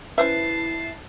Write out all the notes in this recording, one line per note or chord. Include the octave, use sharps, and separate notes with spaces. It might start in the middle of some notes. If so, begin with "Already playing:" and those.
C#4 E4 B4 C5 E5 A5 C7